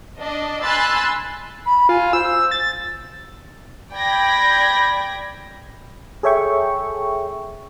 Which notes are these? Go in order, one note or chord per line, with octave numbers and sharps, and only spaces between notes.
D4 D#5
G#5 B5 C6 E6 F#6 A6
B5
F4 G#5
C5 E6
A6
D5 G5 B5 G6 G#6 A#6
G#4 A4 C#5 E5 G5 C#6